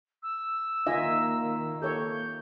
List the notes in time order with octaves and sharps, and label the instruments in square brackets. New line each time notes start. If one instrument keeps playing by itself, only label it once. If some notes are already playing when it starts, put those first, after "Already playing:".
[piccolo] E6
[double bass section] D#3 A#3 [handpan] D#4 F4 E5 [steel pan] D#5 G#5
[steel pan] G4 A4 C#5 [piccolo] G6